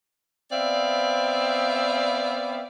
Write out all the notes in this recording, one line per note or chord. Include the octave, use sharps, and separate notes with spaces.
B3 C4 D5 E5 F5